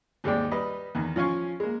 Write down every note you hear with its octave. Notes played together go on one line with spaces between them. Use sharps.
D#2 G#2 G3 G#3 D5 G5
G3 B4 D#5 B5
E2 D#3
F3 C#4 F5 G#5 C#6
G#3 A#3